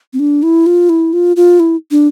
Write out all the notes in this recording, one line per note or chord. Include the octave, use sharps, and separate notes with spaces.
C4
D4
E4
F4
E4
F4
F4
E4
D4